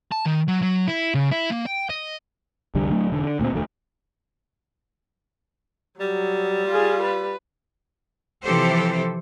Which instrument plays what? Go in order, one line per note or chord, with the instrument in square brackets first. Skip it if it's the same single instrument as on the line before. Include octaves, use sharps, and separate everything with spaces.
[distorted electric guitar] A5
D#3
F#3
F#3
E4
C#3
E4
A#3
G5
D#5
[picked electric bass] F1 C2 D3 G3
D1 F#3 A3 D4
E1 D3
D3
D2 A#2 B3 C4
E1 D2 A3
[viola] F#3 [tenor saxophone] G3
[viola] F4 G#4
B4
[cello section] C3 E3 F3 G4 A4 C5